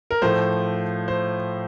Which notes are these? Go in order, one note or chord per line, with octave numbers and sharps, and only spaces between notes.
A#4
A2 F3 A3 C5
C5